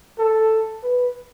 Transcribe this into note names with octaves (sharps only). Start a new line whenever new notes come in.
A4
B4